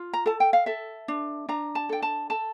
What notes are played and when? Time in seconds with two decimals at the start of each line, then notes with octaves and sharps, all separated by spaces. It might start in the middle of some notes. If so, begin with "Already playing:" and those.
Already playing: F4
0.13 A#5
0.26 A4 A5
0.40 G5
0.53 F5
0.66 A4 E5
1.08 D4
1.49 D4 A#5
1.75 A5
1.89 A4 G5
2.02 A5
2.30 A4 A5